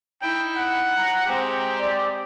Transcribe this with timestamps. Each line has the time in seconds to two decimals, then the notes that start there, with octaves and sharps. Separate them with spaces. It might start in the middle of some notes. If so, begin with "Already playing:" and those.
0.22 D#4 E4 G5
0.56 F#5
0.97 A#5
1.26 G#3 C4 G4
1.79 D5